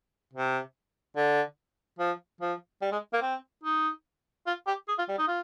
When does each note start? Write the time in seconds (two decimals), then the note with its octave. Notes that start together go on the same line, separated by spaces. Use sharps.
0.34 C3
1.17 D3
1.99 F3
2.41 F3
2.82 G3
2.92 G#3
3.13 A#3
3.22 C4
3.63 D#4
4.47 F4
4.67 G4
4.88 G#4
4.98 F4
5.08 G3
5.18 D#4
5.28 F4